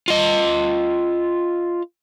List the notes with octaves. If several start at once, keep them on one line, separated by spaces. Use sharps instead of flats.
F4 D#5